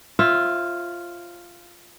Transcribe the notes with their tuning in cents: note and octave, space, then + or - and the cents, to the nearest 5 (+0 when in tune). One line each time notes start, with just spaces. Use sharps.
F4 -5 C5 +45 E5 +0